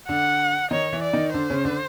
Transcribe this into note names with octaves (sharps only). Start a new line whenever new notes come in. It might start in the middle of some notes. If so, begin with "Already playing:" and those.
D3 D4 F#5
D#3 D#4 C#5
E3 E4
D5
D#3 D#4
D3 D4 C5
C#3 C#4
D3 D4